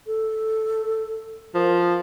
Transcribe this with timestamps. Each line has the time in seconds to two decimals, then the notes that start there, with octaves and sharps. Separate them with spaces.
0.07 A4
1.55 F3 A#4